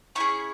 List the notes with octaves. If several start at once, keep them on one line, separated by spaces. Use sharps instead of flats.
C#4 E4 G#4 C#6